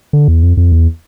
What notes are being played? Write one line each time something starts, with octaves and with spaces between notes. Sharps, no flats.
D3
E2
F2
F2
E2